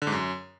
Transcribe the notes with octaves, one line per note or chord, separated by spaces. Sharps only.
D3
G#2
F#2